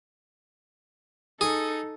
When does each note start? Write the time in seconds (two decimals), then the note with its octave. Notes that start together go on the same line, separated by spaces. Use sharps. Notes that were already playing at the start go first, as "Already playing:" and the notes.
1.41 D#4 G#4 A4